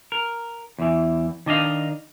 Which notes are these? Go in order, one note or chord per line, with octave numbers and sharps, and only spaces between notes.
A#4
E2 E3
D#3 D4 D#5 F5